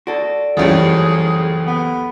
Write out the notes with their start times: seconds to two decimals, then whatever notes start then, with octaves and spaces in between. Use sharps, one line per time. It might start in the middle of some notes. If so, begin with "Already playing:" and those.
0.07 F#4 A4 D5
0.57 F#1 C#2 G2 E3 C#4 G#4 A4
1.67 B3